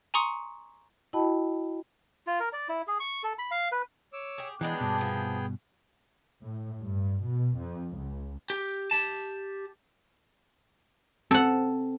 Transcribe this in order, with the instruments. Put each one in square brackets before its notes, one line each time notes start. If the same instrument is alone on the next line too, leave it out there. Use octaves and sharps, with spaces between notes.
[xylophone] G#5 A#5 C6 C#6 D#6 C#7
[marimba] E4 F#4 D#5 G5 A5 B5
[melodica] F4
A#4
D5
E4
G#4
C#6
A4
B5
F5
B4
[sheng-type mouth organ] C#5 D6 E6
[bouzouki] G4 G#4
[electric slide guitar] E3 [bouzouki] F#3 G#3 D4 [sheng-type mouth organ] B3 G#4 G5
[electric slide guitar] G2 B2
[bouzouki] C3 F3
[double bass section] A2
G2
B2
F2
C#2
[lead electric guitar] G4
G4 A5
[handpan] C4 [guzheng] A4 F#5